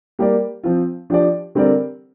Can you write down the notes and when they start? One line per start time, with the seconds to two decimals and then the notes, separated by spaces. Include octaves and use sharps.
0.19 G3 A#3 G4 A#4 D5
0.64 F3 C4 F4
1.10 F3 D4 G4 D5
1.55 D3 G3 C4 A#4 D5